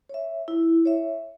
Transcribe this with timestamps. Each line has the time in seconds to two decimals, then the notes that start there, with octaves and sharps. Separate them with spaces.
0.09 C#5 E5
0.48 E4
0.85 C#5 E5